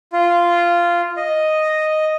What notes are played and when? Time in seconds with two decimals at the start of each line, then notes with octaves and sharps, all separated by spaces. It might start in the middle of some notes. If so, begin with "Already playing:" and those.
0.13 F4
1.17 D#5